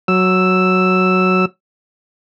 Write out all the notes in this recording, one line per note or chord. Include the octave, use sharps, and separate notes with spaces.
F#3 E6